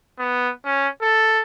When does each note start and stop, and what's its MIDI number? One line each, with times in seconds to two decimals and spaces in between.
0.18 0.50 59
0.64 0.88 61
1.02 1.43 69